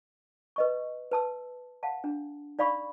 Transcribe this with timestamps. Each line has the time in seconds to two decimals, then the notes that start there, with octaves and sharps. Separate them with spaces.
0.56 B4 D#5 C#6
1.11 B4 A5 E6
1.83 F5 F#5 A5
2.04 D4
2.59 D#4 D5 F5 B5 C#6